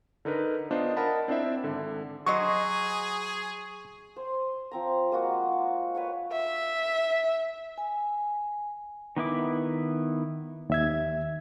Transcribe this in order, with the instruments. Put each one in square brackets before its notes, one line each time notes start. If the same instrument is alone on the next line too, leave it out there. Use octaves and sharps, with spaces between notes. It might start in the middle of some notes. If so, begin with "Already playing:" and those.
[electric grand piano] D3 D#4 A#4 B4
B3 D4 F4 C5 D#5
A#4 D#5 F#5 A5 B5
C4 D4 E4 C5 E5
G#1 D3
[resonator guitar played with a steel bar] F#3 C5 D#5 [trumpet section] G#4 [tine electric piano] C#6
[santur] C5
F3 C4 A#5
G#3 A#3 F4 F#4
D6
B4 C#5 F#5 C#6
[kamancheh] E5
[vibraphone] G#5
[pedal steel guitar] D#3 B3 E4 D6
[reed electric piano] D#2 E5 G#6